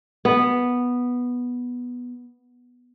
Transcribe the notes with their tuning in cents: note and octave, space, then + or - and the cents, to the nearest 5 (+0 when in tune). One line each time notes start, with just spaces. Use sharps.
B3 -5